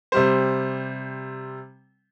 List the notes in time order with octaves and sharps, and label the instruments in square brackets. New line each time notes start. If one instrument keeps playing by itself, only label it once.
[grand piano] C3 G3 C5